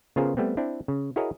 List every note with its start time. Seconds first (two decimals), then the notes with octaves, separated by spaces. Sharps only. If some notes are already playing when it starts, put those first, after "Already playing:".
0.16 C#3 B3 F4 G#4 A#4 C5
0.37 G3 A3 B3 C4
0.57 C4 D4 E4
0.88 C#3
1.16 E4 F#4 G#4 A#4 C#5 D#5